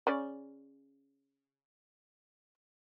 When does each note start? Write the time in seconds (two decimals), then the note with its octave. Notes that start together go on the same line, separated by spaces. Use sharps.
0.07 C#3 C#4 D5